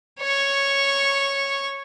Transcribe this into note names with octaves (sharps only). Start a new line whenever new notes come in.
C#5 C#6